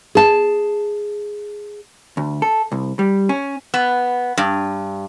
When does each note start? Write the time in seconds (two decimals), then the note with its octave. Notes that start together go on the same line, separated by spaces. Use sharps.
0.15 G#4 A5
2.17 D2
2.42 A4
2.72 C2
2.99 G3
3.29 C#4
3.74 B3
4.38 G2